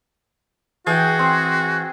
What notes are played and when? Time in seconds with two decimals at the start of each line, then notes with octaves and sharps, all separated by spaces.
0.87 E3 F#4 G#4 G5
1.19 C4